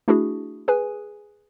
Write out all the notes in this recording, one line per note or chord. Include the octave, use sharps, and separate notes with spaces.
A3 D4 E4 F#4 G#4
G#4 B4 G#5